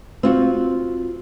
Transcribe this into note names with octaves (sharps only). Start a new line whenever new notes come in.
C4 F4 F#4